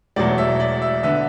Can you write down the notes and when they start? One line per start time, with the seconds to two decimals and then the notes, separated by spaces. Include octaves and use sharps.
0.16 E1 E2 B2 F#3 A3 D5
0.38 E5
0.60 D5
0.82 E5
1.03 D3 B3 E5